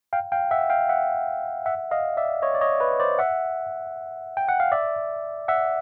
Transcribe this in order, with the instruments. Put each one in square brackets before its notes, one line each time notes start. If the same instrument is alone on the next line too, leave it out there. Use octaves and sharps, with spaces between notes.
[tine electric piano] F5 G5
F5 G5
E5 F#5
F5 G5
E5 F#5
E5 F#5
D#5 F5
D5 E5
C#5 D#5
D5
C#5 D#5
B4 C#5
C5 D5
E5 F#5
G5
F#5
F5
D5 E5
E5 F#5